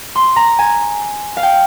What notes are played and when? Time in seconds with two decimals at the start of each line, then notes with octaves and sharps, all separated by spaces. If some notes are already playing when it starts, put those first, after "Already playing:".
0.15 C6
0.36 A#5
0.59 G#5
1.37 F5
1.43 G5